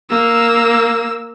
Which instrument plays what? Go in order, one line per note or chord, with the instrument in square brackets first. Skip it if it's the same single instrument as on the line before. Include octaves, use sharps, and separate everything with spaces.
[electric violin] A#3 E6